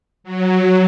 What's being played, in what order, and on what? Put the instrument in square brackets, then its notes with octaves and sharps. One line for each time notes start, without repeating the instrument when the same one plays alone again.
[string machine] F#3